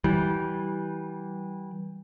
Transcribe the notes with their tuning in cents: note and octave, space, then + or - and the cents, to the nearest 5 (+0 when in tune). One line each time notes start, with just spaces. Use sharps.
E3 -25 G3 -25